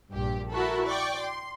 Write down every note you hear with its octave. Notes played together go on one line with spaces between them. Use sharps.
A#1 G2 G4
E4 F#4 A4 A#4 A5 B5
D5 G5 C#6 D6
C6